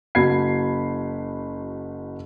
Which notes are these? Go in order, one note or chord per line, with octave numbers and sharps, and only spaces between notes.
F#1 F#4 B5 G#6 C7